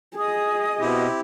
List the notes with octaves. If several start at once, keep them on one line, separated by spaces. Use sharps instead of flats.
G#4 D#5 D#6
B2 C4 E4 G4